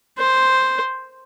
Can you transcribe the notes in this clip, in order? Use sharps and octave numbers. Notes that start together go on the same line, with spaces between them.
C5